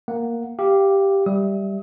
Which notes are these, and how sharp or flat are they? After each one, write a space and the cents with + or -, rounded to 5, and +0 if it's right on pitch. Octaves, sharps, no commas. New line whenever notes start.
A#3 +0 F#5 -5
G4 +0 F5 -15
G3 +0 E5 +0 D#6 +35